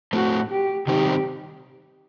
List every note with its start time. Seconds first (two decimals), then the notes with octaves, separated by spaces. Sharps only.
0.13 A2 A3 C4 F#4
0.50 G4
0.87 C3 D#3 G3 C4 D#4 G4